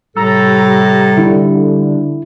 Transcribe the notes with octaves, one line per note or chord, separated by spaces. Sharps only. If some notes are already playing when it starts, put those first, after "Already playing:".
A2 C3 G3 A4 A#5 E6
D3 E4